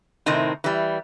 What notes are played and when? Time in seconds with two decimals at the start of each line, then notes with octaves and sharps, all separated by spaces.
0.26 A2 C3 D#3 C4 D#4
0.64 E3 G3